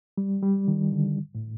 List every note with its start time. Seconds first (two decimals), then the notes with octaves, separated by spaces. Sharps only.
0.18 G3
0.43 G3
0.68 D#3
0.92 D3
1.35 A2